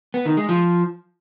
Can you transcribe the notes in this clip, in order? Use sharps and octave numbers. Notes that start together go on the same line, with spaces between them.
B3
D#3
G#3
F3